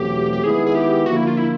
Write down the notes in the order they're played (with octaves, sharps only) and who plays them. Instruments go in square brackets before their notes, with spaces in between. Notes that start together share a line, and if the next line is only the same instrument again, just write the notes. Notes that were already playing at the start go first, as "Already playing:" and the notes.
Already playing: [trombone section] E2 B2 F#3 A3 C4 [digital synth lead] G4
[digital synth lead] G4
[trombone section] D#3 G#3 B3 E4 [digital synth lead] G#4
[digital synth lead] G#4
G4
[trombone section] D3 F3 A#3 [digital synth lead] F#4
[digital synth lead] E4
F4
E4